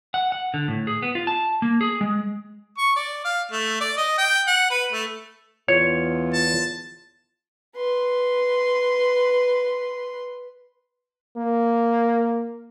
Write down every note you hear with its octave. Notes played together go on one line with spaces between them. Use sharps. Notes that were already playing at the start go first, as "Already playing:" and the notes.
F#5
F#5
D3
A2
G#4
B3
F4
A5
A#3
G#4
G#3
C#6
D5
F5
A3
D5
D#5
G5
F#5
B4
A3
E2 F4 C#5
A5
B4 C6
A#3